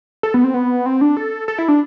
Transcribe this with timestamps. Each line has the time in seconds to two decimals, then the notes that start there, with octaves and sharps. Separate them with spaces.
0.23 A4
0.34 B3
0.44 C4
0.54 B3
0.86 C4
1.01 D4
1.17 A4
1.48 A4
1.58 E4
1.68 D4